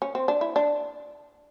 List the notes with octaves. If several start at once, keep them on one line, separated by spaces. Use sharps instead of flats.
C#4
C4
D4
E4
D4